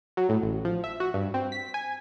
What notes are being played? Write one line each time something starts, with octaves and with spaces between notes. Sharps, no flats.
F#3
A2
A1
F3
E5
F#4
G2
C4
B6
G#5